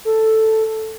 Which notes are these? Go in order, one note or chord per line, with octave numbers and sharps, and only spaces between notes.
A4